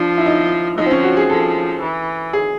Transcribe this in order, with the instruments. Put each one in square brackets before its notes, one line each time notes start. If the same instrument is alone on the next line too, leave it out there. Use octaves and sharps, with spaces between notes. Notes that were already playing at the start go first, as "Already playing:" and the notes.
Already playing: [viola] F3 [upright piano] D4
[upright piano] E4
D#4
[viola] F3 [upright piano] D#4
[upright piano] C4
C#4
F#4
G#4
[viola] F3 [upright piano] A4
[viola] E3
[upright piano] G#4